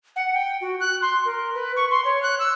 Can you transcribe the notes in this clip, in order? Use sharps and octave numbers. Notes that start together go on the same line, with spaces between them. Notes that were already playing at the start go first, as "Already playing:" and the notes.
F#5
G5
F#4
F#6
C6
A#4
B4
C#6
C6
C#5
F#6
E6